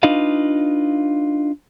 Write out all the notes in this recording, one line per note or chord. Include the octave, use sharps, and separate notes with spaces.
D4 D#4 F4 B4 D#5 F5